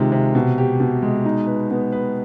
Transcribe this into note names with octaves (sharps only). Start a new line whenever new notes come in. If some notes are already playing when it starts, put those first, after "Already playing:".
Already playing: C3 D#3 G#3 F4
C3
B2
G4
B2
G#3
D#4
B4
B3
B4